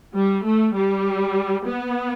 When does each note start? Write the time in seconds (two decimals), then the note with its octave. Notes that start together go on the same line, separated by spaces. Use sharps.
0.14 G3
0.45 A3
0.75 G3
1.66 B3